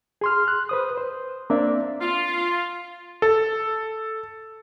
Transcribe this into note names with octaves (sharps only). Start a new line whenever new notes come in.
G#4 C6 F6
F#6
B4 C5 D#6
C5
A#3 C4 D4 D5 E5
F4
A4